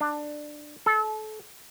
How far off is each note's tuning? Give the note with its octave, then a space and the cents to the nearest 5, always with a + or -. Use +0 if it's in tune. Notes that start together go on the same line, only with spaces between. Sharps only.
D4 +15
A4 -30